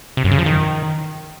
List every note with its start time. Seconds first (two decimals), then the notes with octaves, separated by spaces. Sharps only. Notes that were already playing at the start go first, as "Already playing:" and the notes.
0.17 C3
0.24 F#2
0.32 C#3
0.39 F3
0.46 D#3